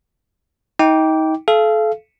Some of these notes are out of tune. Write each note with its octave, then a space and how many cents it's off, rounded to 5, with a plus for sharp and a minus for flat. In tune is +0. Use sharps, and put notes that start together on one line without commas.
D#4 +30 G5 +0 D6 -15
A4 -30 F5 -30